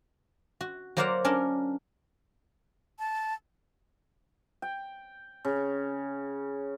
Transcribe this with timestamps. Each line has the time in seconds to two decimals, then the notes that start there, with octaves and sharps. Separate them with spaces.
0.61 F#4
0.97 F#3 A#3 C5 D5 F5 F#5
1.25 C#4 D4 A#4
2.99 A5
4.62 G5
5.45 C#3